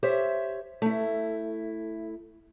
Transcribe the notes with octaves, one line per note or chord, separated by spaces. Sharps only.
G4 C5 C#5 E5
A3 E4